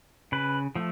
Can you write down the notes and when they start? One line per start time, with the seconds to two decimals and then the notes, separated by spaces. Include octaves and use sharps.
0.32 C#3 B4
0.75 F3 A3